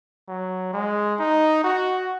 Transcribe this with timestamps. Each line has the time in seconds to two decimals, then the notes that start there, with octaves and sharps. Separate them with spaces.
0.28 F#3
0.73 G#3
1.19 D#4
1.64 F#4